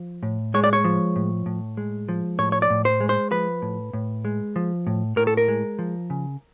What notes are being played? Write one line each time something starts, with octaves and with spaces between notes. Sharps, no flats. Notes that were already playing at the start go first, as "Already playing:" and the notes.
Already playing: F3
A2
G#3 C#5
D5
C#5
F3
A2
A2
G#3
F3
A2 C#5
C#5
D5
A2
C5
G#3
C5
F3 B4
A2
A2
G#3
F3
A2
A2 A#4
A4
A#4
G#3
F3
C#3